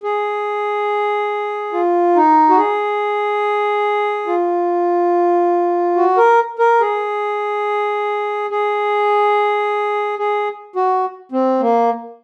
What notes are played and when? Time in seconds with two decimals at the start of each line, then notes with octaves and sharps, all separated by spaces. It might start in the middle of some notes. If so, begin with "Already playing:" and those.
0.03 G#4
1.73 F4
2.16 D#4
2.49 F#4
2.57 G#4
4.27 F4
5.96 F#4
6.17 A#4
6.59 A#4
6.81 G#4
8.50 G#4
10.19 G#4
10.76 F#4
11.32 C4
11.60 A#3